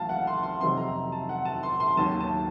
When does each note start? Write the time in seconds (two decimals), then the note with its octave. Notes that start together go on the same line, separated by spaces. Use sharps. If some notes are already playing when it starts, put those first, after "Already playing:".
Already playing: A1 A2 F#3 F5 A5
0.09 F#5
0.27 C6
0.43 C6
0.61 F2 C3 F#3 C4 D#4 C6
0.77 A#5
1.12 A5
1.29 F#5
1.45 A5
1.63 C6
1.80 C6
1.97 D#2 D#3 F#3 A5
2.20 A5